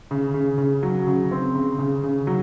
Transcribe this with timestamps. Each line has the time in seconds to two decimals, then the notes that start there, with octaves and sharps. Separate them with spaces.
0.11 C#3
0.34 C#3
0.58 C#3
0.83 F#3
1.07 C#3
1.31 C4
1.55 C#3
1.79 C#3
2.03 C#3
2.27 F#3